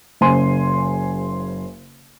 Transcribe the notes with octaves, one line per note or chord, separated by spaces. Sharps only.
F#1 C#3 C5 G#5 C6 D#7